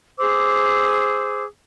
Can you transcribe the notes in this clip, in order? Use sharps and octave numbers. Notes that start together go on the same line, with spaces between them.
G#4 C5 D6 E6